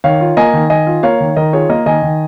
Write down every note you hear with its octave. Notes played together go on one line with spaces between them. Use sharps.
D#3 C#5 F5
F4
A#3 D#5 G#5
D#3
D#3 D#5 G#5
F4
A#3 C#5 F5
D#3
D#3 A#4 D#5
F4 G#4 C#5
A#3 A#4 D#5
D#3 D#5 G#5
D#3